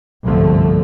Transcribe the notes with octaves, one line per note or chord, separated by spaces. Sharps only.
G1 C2 G#2 D3 F3 A3